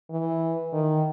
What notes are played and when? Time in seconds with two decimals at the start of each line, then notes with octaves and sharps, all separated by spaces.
0.10 E3
0.73 D#3